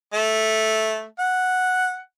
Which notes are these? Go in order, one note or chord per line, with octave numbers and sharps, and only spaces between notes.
A3
F#5